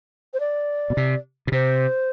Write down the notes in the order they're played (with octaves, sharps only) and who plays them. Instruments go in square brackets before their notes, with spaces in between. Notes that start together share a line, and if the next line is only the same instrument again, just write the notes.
[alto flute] C5
D5
[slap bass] B2
C3
B2
[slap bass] C3 [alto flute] C5